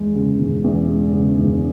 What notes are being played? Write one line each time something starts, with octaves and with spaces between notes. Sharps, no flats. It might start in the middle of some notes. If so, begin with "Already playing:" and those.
Already playing: E2 G#3
C#3
E1
E2
G#3
C#3
E1